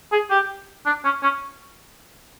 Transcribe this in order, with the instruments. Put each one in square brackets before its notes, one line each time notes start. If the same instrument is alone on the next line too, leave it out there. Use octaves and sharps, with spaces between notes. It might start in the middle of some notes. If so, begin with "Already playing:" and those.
[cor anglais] G#4
G4
D4
C#4
C#4